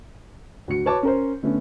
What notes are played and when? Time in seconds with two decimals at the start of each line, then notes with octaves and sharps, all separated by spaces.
0.68 D2 F#4 C#7
0.85 F#4 B4 C#5 A5 D6
1.03 C#4 A#4 C5
1.43 D3 A3 B3 C#4